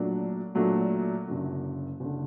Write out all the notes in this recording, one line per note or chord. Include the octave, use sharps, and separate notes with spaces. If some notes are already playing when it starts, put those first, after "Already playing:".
Already playing: A#2 F#3 A3 D4
A#2 F#3 A3 D4
F#1 F#2 D3
F#1 D3